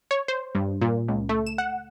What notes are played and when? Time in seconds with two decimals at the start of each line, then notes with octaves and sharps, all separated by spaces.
0.11 C#5
0.28 C5
0.55 G2
0.82 A#2
1.08 C#2
1.29 A3
1.47 E7
1.58 F#5